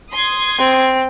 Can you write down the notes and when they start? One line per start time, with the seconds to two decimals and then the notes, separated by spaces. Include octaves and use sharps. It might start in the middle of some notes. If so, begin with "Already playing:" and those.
0.12 C6 D#6 G#6
0.59 C4